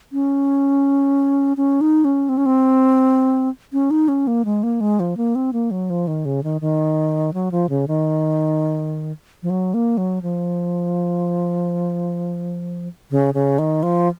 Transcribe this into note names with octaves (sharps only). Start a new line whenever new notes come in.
C#4
C#4
D#4
C#4
C4
C#4
C4
C#4
D#4
C#4
A#3
G#3
A#3
G#3
F3
A#3
C4
A#3
F#3
F3
D#3
C#3
D#3
D#3
F#3
F3
C#3
D#3
F3
F#3
A#3
F#3
F3
C#3
C#3
D#3
F3